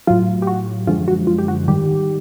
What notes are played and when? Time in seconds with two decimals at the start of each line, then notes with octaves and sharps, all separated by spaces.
0.07 A2 F#3 F4
0.42 G4
0.47 F#4
0.87 F#2 D3 F3 G#3 F4
1.08 F#4
1.27 F4
1.38 G4
1.48 F#4
1.68 G#2 D#3 G3 G4